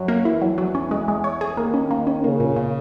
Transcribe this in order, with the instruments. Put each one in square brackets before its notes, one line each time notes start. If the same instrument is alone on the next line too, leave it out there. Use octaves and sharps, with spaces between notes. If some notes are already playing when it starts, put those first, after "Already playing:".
Already playing: [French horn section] F#2 F#3
[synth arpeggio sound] A#3
[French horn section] E2 E3 [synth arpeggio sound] E4
[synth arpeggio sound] F#3
F#3
C#4
G#3
G#3
C#5
G#4
[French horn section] D#2 D#3 [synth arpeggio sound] A#3
[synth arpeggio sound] C#4
A#3
C#4
[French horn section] C#3 [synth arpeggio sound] A#3
[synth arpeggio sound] A#2
A#2